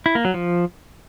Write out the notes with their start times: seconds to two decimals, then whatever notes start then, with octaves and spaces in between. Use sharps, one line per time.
0.06 E4
0.15 A#3
0.25 F#3
0.34 F3